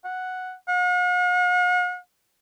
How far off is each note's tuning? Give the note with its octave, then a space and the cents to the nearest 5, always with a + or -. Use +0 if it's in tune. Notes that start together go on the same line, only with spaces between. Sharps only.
F#5 +0
F#5 -45